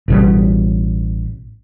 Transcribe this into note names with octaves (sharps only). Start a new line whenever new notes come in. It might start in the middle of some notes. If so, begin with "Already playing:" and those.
A1 B2 G3